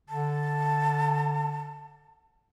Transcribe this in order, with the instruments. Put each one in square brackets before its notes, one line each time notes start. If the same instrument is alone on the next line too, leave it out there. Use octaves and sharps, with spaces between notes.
[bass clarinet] D3 [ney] A5